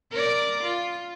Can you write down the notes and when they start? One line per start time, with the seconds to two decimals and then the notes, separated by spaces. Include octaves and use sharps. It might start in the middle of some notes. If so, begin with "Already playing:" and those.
0.11 A#4 D5
0.64 F4